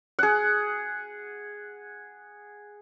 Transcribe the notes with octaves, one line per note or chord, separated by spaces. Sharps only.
G#4 F#5